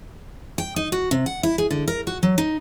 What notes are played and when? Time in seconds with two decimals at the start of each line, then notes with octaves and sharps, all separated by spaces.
0.58 G5
0.76 D#4
0.92 F#4
1.11 C3
1.26 F#5
1.43 E4
1.58 G#4
1.71 D3
1.88 A#4
2.07 F#4
2.23 F#3
2.38 D#4